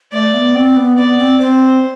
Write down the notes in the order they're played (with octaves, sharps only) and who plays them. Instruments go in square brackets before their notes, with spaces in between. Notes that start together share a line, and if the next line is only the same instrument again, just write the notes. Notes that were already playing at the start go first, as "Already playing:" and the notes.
[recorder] A3 [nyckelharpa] D5
[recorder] B3
C4
B3
[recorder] B3 [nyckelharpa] D5
[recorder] C4
[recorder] C4 [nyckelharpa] C5